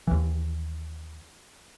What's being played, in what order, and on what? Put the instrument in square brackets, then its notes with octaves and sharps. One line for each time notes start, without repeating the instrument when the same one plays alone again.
[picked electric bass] D#2 E3